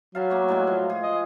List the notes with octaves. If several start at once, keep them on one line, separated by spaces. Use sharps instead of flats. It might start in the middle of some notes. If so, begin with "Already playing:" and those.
F#3 F5 A5 B5
A3 A#3 G#4
A2 G3 G#3
F3
G#4
D#5